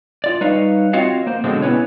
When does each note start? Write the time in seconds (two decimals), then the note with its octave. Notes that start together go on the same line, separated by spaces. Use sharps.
0.24 F4 D5
0.41 G3 D#4 B4 C#5 D#5 F5
0.93 C4 F4 F#4 C#5 D#5 F5
1.27 A#3 C5
1.44 B2 D3 F#3 G#3 C4
1.62 B3 C#4 E4 B4 C#5